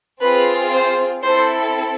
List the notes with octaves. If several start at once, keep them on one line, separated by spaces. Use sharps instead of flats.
C4 F4 G#4 B4
C5
C4 E4 A4 C5